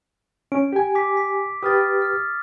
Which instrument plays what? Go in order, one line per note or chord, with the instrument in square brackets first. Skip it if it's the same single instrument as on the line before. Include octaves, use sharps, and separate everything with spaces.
[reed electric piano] C#4 [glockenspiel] D7
[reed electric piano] G4 G#5
[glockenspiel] D6 B6
B6
[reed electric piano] G4 B4 [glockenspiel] D#6 F6 A6
[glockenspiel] F6